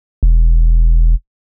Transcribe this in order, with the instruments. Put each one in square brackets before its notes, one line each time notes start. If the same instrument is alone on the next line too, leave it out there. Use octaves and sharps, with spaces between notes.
[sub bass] E1